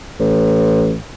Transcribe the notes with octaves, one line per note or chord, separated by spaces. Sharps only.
A1